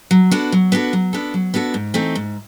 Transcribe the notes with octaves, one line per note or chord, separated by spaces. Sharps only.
F#3
B3 D4 F#4 A4
F#3
B3 D4 F#4 A4
F#3
B3 D4 F#4 A4
F#3
B3 D4 F#4 A4
G#2
E3 A3 C4 D#4
G#2